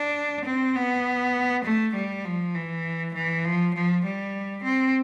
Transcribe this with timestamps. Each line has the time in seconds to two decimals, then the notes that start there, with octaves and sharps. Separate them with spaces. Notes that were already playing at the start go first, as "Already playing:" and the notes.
Already playing: D4
0.45 C4
0.75 B3
1.64 A3
1.95 G3
2.25 F3
2.55 E3
3.15 E3
3.45 F3
3.74 F3
4.04 G3
4.64 C4